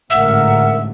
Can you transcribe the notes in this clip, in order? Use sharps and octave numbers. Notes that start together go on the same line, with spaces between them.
A1 G#2 D3 A#4 E5 F#5